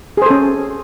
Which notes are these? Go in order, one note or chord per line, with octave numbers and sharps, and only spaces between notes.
C#4 G#4 A4 C5